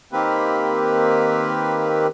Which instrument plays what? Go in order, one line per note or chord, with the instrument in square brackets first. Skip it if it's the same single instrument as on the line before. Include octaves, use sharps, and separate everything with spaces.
[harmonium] D#3 A#3 C4 G4 B4